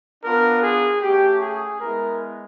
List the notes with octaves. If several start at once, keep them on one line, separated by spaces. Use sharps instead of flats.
B3 D4 F4 A#4
G#4
A3 C#4 F#4 G4
G#4
G#3 B3 E4 A#4